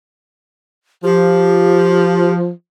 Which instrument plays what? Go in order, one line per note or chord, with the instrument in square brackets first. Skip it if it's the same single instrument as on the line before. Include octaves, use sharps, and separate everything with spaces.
[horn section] F3 [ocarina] G4